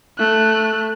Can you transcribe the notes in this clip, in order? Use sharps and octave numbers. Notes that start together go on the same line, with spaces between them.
A3 F#6